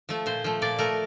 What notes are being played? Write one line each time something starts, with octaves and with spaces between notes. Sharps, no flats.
F3 A3
A#2 C5
F3 A3
A#2 D5
A3 A#4